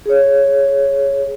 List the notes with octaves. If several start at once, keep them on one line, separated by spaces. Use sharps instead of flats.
G#4 C#5